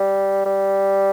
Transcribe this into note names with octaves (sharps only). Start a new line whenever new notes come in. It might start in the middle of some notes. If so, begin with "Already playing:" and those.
Already playing: G3
G3